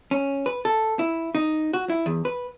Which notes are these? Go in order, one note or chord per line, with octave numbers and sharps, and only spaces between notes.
C#4
B4
A4
E4
D#4
F#4
E4
E2
B4